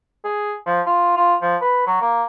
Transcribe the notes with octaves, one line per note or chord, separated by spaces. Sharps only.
G#4
F3
F4
F4
F3
B4
F#3
A#3